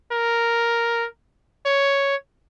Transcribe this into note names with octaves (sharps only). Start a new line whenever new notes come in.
A#4
C#5